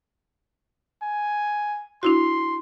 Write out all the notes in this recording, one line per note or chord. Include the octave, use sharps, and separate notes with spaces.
G#5
D4 E4 F#4 C6